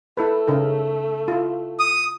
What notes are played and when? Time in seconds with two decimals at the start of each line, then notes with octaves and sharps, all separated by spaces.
0.17 A3 E4 A4 B4
0.47 C#3 D#4 A#4
1.28 E4 F4
1.79 D#6